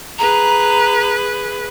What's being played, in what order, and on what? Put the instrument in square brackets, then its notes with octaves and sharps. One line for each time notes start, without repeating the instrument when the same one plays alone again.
[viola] G#4 B4 [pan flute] A#5